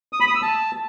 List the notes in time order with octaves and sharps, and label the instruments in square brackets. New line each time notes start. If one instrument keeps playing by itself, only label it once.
[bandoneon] D#6
B5
D#6
E6
A5